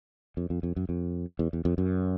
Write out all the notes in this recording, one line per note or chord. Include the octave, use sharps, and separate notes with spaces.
F2
F2
F2
F#2
F2
E2
E2
F2
F#2